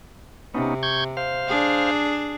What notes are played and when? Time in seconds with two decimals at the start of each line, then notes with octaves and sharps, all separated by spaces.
0.55 C3 B3 C#4 D#4
0.83 C#6 G6 G#6
1.17 C5 F5
1.48 D4 G#4